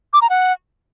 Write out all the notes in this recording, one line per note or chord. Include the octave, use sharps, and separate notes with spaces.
D6
A#5
F#5